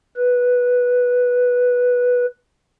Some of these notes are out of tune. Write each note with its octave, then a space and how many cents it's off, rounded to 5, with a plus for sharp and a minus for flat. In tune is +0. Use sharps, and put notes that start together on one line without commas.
B4 -5